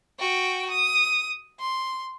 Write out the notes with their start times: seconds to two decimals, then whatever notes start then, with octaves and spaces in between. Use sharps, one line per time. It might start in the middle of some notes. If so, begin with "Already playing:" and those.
0.19 F#4 G5
0.70 D#6
1.60 C6